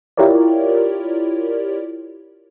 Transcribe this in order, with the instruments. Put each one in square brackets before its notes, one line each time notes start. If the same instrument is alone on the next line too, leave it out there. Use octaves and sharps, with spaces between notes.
[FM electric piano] E4 F4 G4 A#4 C#5 D5